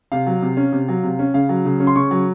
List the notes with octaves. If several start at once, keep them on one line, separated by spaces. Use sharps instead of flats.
C3 F5
F#3
C3
C#4
C3
F#3
C3
C#4
C#3 F5
F#3
C#3
C#4
C6
C#3 C#6
F#3